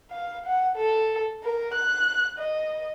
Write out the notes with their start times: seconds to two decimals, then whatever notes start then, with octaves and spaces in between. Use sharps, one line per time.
0.11 F5
0.46 F#5
0.76 A4
1.44 A#4
1.74 F#6
2.38 D#5